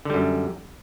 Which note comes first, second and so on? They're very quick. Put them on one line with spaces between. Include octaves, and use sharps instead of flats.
D3 G3 F#2